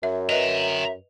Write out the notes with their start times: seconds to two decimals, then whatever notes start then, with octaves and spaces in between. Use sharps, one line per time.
0.03 F#2 E5
0.29 B4 D#5 E5 G5 A#5